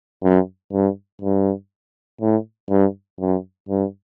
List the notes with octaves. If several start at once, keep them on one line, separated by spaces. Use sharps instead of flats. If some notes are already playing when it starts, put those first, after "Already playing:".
F#2
G2
G2
A2
G2
F#2
G2